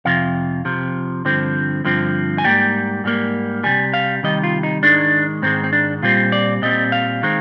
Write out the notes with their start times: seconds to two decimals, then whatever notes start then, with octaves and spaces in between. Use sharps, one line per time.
0.05 F2 C3 F3 F5
0.65 F2 C3 F3
1.25 G2 D3 F3 C4
1.85 G2 D3 F3 C4
2.38 G#5
2.44 G#2 G3 A#3 G5
3.04 G#2 G3 A#3
3.64 C3 D#3 G3 G#5
3.94 F5
4.23 C3 D#3 G3 D#5
4.44 F4
4.63 D#4
4.83 G#2 D#3 G#3 D4
5.42 G#2 D#3 G#3 C4
5.64 C4
5.73 D4
6.03 A#2 G3 C4 F4
6.32 D5
6.62 A#2 G3 C4 D#5
6.92 F5
7.23 D#3 G#3 C4